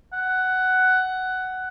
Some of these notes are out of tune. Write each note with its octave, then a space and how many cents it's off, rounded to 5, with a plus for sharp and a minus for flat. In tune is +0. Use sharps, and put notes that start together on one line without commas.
F#5 +10